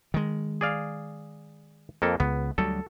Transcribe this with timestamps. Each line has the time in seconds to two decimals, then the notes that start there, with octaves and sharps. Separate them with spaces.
0.14 D#3 G#3
0.61 G#4 D5 F5
2.02 F2 A#3 A4
2.20 C#2 B3
2.58 D2 F#3 G3 A4